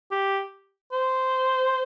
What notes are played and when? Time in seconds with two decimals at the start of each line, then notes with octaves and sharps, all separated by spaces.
0.11 G4
0.92 C5